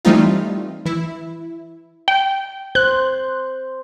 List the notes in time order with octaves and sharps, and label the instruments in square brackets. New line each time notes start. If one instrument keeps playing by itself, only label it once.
[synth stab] E3 G3 A3 C4 D#4 F4
E3 E4
[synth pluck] G5
[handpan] C5 [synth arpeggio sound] F#6